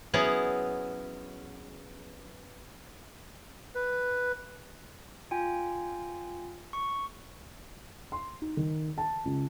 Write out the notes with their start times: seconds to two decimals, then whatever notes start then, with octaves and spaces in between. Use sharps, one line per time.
0.14 F#3 B3 C#4 E4 G#4
3.75 B4
5.31 F4 G5 G#5
6.73 C#6
8.12 C6
8.42 D#4
8.57 D#3
8.98 A5
9.25 C#2